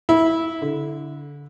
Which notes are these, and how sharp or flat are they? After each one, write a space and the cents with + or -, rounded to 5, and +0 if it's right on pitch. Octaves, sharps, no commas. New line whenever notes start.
E4 -15
D3 -25